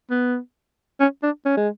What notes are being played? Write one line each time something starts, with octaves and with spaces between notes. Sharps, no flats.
B3
C#4
D4
C#4
G#3